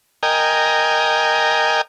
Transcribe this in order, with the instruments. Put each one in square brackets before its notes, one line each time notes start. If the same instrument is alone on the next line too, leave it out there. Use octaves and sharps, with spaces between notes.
[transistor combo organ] A#4 D#5 G5 G#5